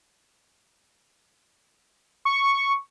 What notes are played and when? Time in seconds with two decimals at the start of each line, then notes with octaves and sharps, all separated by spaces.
2.25 C#6